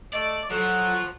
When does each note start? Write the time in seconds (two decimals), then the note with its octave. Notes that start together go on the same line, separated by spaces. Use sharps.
0.13 A3 D5 D#5 D7
0.51 F3 F#3 A4 F#5